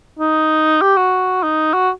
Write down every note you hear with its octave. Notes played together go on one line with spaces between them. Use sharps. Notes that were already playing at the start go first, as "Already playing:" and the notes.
D#4
G4
F#4
D#4
F#4